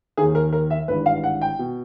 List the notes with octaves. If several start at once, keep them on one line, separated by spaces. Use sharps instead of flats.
D#2 D#3 G#4
A#4
A#4
E5
G#1 G2 E3 B4
F5
F#5
G5
B2